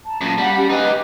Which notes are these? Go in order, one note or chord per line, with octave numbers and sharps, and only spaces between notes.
A5 A#5
F#2 A#2
G3 F5 F#5
C#4 G4 F#5
D#4 G4 B4 D#5